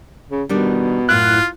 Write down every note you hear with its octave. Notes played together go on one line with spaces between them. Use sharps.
C#3
B2 D#3 G3 D4
F#2 A2 F4 F#6